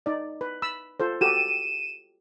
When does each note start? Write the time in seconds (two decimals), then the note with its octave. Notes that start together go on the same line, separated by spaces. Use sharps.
0.06 D#4 D5
0.41 B4
0.62 B5 E6
1.00 F4 A4 C5
1.21 F#4 G4 A4 D#7 E7